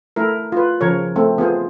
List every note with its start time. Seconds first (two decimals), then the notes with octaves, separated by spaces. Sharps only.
0.16 A3 E4 A#4
0.52 F4 B4
0.81 C#3 F3 A#4 C#5
1.16 A3 C4
1.38 B3 F4 G#4 C5